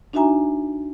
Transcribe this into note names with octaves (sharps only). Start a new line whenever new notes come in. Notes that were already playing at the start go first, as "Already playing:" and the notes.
D4 D#4 F#4 E5 G#5 A#5